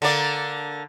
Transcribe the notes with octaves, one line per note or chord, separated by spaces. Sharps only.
D3 A#3 D5